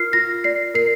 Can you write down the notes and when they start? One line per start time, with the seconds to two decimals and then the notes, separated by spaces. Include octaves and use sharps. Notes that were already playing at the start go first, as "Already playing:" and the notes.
Already playing: F4 A#4 F6 C7
0.13 F4 A#6
0.44 D5 C7
0.74 A#4 C7